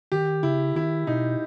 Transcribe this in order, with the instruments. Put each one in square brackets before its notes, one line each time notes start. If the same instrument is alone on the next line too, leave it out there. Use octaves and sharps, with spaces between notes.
[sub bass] D#3 [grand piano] G4
[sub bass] C#3 [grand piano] E4
[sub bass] D#3 [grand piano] E4
[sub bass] B2 [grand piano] D#4